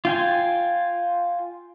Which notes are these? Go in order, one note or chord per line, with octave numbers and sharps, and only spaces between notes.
F4 G5 G#5